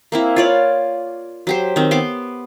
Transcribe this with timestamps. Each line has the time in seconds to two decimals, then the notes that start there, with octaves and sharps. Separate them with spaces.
0.12 A#3 C4 E4
0.36 F4 C#5 D5
1.47 F#3 G4 C5
1.76 D#3 C4
1.91 B3 C6 D6